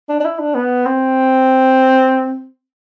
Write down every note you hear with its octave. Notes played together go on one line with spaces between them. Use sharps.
D4
D4
E4
D4
B3
C4